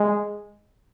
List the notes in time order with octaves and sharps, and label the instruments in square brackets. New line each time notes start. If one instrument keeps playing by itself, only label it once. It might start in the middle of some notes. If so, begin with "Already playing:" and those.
Already playing: [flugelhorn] G#3